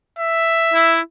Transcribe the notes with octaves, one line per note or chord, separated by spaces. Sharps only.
E5
E4